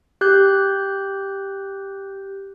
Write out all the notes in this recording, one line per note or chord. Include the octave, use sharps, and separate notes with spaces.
G4 F#6 G6